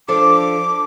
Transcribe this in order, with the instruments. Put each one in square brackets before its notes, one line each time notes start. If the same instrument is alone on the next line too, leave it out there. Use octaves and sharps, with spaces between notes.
[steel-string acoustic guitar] F3 D4 A4 [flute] D6